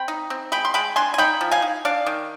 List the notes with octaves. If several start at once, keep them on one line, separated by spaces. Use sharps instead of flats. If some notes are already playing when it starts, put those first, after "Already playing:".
Already playing: C4 G5 B5
D#4
C4
G#3 G5 B5
C6
G#3 G5 B5
D4 G#5 C6
G#5
D#4 G5 B5
F3
F5 G#5
D#4
D4 D5 F5
D#3